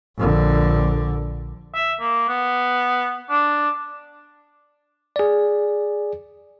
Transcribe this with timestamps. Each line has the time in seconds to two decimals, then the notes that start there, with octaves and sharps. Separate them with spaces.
0.18 A#1 D3
1.75 E5
2.00 A#3
2.29 B3
3.30 D4
5.16 G#4 D5